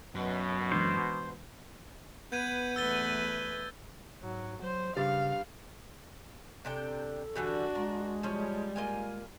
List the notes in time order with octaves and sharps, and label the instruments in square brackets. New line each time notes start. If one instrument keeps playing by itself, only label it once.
[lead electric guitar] F#2 [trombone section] B2
[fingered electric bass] E3 G#3 D4 [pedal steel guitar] C5
[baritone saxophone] B3 [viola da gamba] B4 [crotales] G6 G#6 D#7
[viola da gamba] E2 A3 B4 [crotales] E6 A6 G7
[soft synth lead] G#2 [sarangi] F#3
[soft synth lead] F#3 [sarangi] C5
[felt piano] G2 G3 A6 [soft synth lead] C#3 [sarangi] F5
[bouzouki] C3 D4 G5 [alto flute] A4
[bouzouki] D3 E3 G3 [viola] D4 F#4
[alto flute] G#3 [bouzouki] A#4
[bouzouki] F3 C#4 [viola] G3
[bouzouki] A#3 F4 G#5